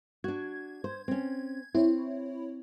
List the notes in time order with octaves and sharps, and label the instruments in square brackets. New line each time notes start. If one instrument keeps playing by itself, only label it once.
[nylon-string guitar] D4 F#4 [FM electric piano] G#6
[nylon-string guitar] C5
C4 C#4
[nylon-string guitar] C4 [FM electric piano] E4 C#5